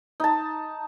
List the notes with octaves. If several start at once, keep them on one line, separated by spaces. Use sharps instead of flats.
D#4 A5